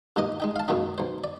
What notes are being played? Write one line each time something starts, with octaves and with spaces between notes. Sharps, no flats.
G2 A#2 D#4 D#5 D6
G#3 D#4 G5
F5 A5
F#2 A#2 C#3 F#3 D#4
B1 C5
D5